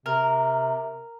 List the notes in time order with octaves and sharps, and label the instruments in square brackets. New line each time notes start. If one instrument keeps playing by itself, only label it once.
[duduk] C3 [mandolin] A#4